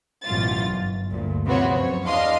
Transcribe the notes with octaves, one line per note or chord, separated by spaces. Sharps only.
A1 F#2 B2 E3 F4 A6
G1
D2 G2 A#2
C3 F3 B3 C4 F#4 C#5
F#2 C#5
E2 D4 D#5 F5 C6